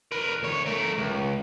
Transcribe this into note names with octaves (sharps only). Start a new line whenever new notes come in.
A#4 B4
D2 C#5
A3 A#4
C#2